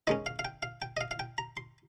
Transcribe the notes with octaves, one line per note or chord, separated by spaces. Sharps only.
D#3 G#3 C#4 D#5
F5
F5
G5
F5
G5
D#5
F5
F5
G5
A#5
C6